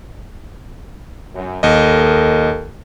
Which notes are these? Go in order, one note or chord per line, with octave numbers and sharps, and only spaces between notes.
F#2
D#2 A4 A#4 D#5